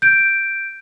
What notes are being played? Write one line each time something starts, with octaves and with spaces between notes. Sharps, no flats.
G6 D7